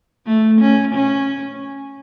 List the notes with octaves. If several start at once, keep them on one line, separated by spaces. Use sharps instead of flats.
A3
C#4
C#4